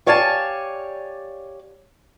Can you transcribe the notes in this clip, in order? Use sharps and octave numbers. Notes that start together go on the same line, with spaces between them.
G4 C#5 D5 F5 G#5 A5